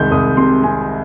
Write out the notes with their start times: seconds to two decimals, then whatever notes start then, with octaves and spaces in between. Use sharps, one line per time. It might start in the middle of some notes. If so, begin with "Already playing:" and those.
Already playing: C2 D#3 G#3 G6
0.11 C2 D#6
0.37 C3 C6
0.63 C3 G#5